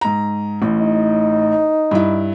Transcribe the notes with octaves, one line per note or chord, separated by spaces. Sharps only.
G#2 A#5
A1 A2
D#4
G2 E4